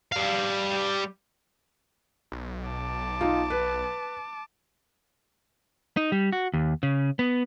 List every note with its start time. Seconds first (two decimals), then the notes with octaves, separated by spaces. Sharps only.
0.12 G3 F5
2.32 B1
2.69 A5 D6
3.21 D#4 F4
3.50 B4
5.97 D#4
6.12 G3
6.32 F#4
6.54 D#2
6.83 C#3
7.19 B3